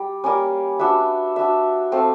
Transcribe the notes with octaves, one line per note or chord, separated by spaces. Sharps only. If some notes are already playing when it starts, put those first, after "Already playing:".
Already playing: G3
G3 A#3 C#4
D4 F#4 B4 E5
D4 F#4 B4 E5
F3 A3 C4 F4